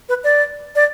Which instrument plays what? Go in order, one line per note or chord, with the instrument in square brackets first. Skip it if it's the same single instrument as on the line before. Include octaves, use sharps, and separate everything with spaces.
[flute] B4
D5
D5